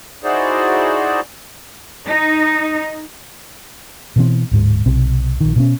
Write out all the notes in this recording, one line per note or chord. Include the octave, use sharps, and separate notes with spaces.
D#4 E4 F#4 G#4 C5 D5
D#4
B2 E3 C4
D1 G#2 G#3
B1 C3 C4
A#1 D#3
B2 A3 C#4